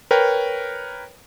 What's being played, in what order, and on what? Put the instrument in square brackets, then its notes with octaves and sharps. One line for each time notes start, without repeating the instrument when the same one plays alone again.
[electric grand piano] A#4 B4 C#5 G5